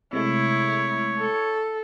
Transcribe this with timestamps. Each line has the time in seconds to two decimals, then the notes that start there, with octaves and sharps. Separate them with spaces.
0.13 C3 G#3 A3 E4 C#5
1.18 A4